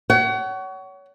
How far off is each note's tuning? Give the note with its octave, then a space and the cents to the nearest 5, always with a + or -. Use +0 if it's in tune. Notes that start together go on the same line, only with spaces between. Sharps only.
C#5 +25 F#5 +35